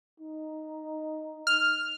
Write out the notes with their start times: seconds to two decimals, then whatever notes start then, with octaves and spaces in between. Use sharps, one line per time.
0.20 D#4
1.47 F6